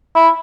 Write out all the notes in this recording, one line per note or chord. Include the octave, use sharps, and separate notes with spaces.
E4